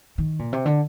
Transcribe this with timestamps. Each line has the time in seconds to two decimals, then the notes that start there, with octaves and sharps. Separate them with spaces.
0.18 D#3
0.39 A#2
0.53 C3
0.66 D3